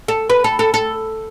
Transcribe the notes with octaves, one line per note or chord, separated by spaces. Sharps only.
A4
B4
A4
A4
A4